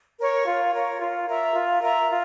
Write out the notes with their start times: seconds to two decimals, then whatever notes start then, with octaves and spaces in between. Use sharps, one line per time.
0.19 A#4 C#5
0.45 F4
0.73 A#4 C#5
1.00 F4
1.28 A#4 E5 A#5
1.54 F4
1.82 A#4 E5 A#5
2.09 F4